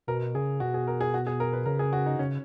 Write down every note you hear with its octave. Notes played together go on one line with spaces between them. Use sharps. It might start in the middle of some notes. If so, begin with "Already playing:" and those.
B2 A#4
C#3 G#4
B2 F#4
G#4
A#4
G#4
F#4
G#4
A#4
B4
C#3 A#4
G#4
F#4
D#4
C#3 C#4